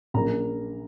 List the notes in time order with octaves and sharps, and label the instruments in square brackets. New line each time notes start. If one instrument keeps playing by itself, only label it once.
[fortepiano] A#1 A#2 A#3 C#4 A#5